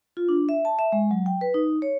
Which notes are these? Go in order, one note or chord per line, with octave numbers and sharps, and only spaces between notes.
F4
D4
E5
A5
E5
G#3
F#3
G5
B4
D#4
C#5